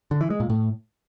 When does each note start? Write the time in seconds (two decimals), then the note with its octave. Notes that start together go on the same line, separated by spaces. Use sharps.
0.11 D3
0.21 E3
0.30 G#3
0.40 A#2
0.50 A2